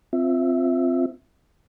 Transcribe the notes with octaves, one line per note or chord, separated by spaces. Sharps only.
C4 F4 E5